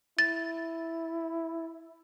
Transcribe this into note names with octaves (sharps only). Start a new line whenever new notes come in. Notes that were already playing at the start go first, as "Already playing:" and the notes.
E4 A6